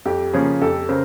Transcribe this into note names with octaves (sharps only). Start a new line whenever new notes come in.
F2 G4
C#3 F3 A#3 C#4 G#4
F2 G4 A4
C#3 A#4 C5